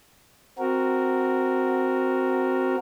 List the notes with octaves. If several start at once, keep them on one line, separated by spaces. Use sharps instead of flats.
C4 F#4 A#4